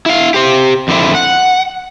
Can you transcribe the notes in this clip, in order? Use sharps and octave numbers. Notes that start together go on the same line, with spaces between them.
E4 F5
G4 C5
F2 D3 C4 E4
F#5